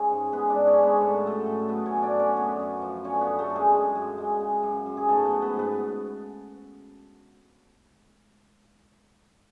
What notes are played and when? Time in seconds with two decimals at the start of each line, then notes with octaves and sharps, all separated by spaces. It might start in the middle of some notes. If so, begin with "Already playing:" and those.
Already playing: G#3 C#4 C#5
0.10 G#2
0.33 G#3 B3 B4
0.49 D4 D5
0.55 G#2
0.67 C#4 C#5
0.77 G#3
0.83 B3 B4
1.00 A2 A4
1.14 B4
1.23 F#3 A3 A4
1.46 A2
1.68 F#3 B3 B4
1.86 C#4 C#5
1.91 A2
2.02 D4 D5
2.14 F#3
2.19 C#4 C#5
2.36 F#2 B3 B4
2.59 F#2
2.82 F3
3.04 D3 C#4 C#5
3.21 B3 B4
3.27 F#2
3.39 A3 A4
3.50 F#2
3.56 G#3 G#4
3.72 F#2
3.95 F#2
4.18 G#3
4.41 C#3
4.63 F#2
4.86 F#2
4.97 G#4
5.08 G#2 A3 A4
5.25 B3 B4
5.31 F#3
5.42 B3 B4
5.54 G#2
5.59 B3 B4